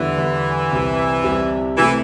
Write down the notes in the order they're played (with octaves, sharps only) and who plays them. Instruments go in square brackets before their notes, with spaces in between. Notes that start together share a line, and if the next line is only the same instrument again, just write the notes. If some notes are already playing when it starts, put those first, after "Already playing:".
Already playing: [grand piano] E2 D3 G3 E4 [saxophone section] E3
[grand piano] E2 D3 G3 E4
C2 C3 G3
C2 C3 G3
[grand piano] C2 C3 A3 [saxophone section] E3